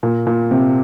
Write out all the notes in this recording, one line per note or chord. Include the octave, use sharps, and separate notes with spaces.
A#2
A#2
C3